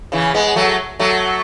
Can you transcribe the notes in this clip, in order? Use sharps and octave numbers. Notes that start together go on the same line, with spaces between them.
C#3 E3
G#3 B3
F#3 A3
F#3 A3